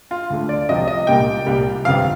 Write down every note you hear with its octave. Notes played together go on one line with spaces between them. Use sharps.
F4
D2 D3 A3
D5
C2 C3 F3 D#5
D#5
C2 A#2 G3 G5
C2 A#2 G3
G1 F2 C3 F3 F5